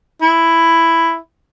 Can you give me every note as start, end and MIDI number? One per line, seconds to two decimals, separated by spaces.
0.22 1.17 64